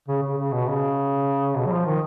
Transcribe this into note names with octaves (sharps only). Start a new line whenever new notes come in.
C#3
C#3
C#3
B2
C#3
B2
F#3
F3
D#3